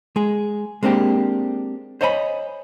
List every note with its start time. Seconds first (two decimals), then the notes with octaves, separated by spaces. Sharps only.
0.16 G#3 G#4
0.83 G#3 A#3 C4 D4 G4
2.01 C5 C#5 D#5 G#5 A5 B5